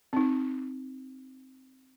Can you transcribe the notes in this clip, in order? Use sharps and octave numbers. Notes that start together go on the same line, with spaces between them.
C4 D#4